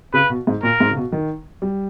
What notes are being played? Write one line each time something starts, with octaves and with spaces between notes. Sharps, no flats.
C#3 B4
B2
G#2
A#2 A#4
G#2
C#3
B2
D#3
G3